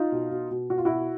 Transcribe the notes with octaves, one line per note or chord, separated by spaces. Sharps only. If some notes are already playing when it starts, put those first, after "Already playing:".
Already playing: D#4 F4
B2
B2
B2
B2 F#4
F4
B2 E4 F#4